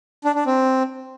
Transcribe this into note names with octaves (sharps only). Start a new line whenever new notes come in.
D4
D4
C4